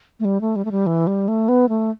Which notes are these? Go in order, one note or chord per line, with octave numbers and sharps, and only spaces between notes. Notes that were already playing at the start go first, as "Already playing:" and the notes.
A3
G3
A3
G3
A3
G3
E3
G3
A3
B3
A3